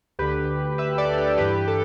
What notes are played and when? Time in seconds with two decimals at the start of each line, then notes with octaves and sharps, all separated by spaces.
0.19 D2 D3 G4 B4
0.78 B4 E5
0.98 A4 D5
1.18 G4 B4
1.38 G2 E3 G4 B4
1.68 A4